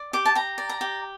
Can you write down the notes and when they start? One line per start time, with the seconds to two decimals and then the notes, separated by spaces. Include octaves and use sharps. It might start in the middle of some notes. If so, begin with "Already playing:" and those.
Already playing: D5
0.13 G4 D6
0.26 A5
0.35 G4 A#5
0.58 D5
0.69 A#5
0.81 G4